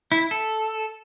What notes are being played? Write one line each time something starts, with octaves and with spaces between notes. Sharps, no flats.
E4
A4